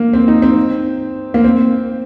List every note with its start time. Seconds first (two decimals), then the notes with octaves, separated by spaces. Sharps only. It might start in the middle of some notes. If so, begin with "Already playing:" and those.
Already playing: A#3
0.13 C4
0.28 D#4
0.42 C4
1.34 A#3
1.44 C4